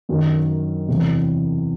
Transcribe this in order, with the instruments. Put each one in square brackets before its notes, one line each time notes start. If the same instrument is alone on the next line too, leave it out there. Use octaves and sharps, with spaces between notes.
[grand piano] F#2 D#3 F#3
E2 C3 E3